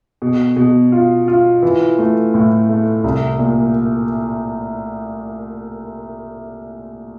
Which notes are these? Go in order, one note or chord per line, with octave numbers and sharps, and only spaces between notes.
B2
B2
F4
F4
E3
A3
A2
A3
C2
A#2